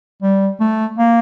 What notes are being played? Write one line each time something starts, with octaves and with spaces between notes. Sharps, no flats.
G3
A3
A#3